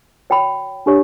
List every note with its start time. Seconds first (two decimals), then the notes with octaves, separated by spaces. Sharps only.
0.30 F#4 C#5 G5 B5
0.86 D4 G4 C#5